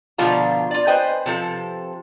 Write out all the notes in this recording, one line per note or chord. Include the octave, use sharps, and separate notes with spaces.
B2 D3 F3 F4 A#5
F4 D5
B4 C5 D#5 G5 G#5
C3 F3 A4